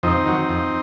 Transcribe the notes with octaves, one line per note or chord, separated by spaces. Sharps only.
F2 C4 D#4
D#3 F#3
F2